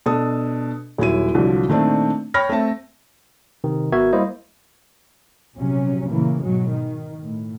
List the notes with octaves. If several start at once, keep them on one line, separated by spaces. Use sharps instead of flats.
B2 D4 A4 D#6
D#1 F#3 E4 D#7
C2 D3 F3 F#3
A#2 D#3 A3 C4 D4
C#5 G5 B5 F6 A#6
A3 C4 E5 A5
C3 D#3
G#1 B3 F#4 A#4 E5 G#6
G3 A#3 E4 C5 D#5
A#1 C3 F#3 C#4
A#2 C#3 E3 A#3
G#2 B2 F#3 G#3
D#3
A2